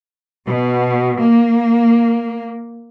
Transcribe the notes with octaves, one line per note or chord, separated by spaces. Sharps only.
B2
A#3